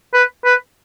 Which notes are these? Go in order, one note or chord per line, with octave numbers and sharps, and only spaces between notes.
B4
B4